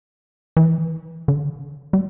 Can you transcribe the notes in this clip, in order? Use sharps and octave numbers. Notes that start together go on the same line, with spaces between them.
E3
D3
G3